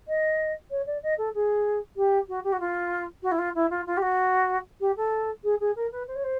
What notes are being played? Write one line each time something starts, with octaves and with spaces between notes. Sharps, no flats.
D#5
C#5
D5
D#5
A4
G#4
G4
F#4
G4
F#4
F4
F#4
E4
F4
E4
F4
F4
G4
F#4
G4
A4
G#4
G#4
A#4
B4
C5
C#5
C5